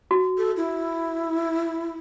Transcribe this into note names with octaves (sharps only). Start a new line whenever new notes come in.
F#4
A4
E4